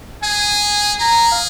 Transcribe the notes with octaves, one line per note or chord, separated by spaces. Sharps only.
G#4 G#5
G#4 A#5
F5